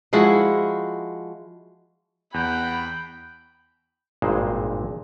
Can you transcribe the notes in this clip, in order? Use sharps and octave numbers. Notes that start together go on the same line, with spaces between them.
F3 G#3 E4 F#4
E2 F#5 G5 B5
G#1 G2 A#2 G#3 C5